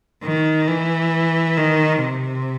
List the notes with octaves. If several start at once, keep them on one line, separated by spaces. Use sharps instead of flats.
D#3
E3
D#3
C3